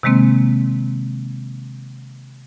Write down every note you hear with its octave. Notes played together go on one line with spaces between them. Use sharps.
C3 D#3 G#3 A#3 C4